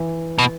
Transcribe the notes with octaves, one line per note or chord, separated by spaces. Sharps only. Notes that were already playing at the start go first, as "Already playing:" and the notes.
Already playing: E3
B2